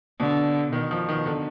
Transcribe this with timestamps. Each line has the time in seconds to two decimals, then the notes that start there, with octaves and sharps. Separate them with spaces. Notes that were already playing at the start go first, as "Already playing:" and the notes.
0.19 B2 D3
0.73 B2 D#3
0.91 F3
1.09 D#3
1.26 D3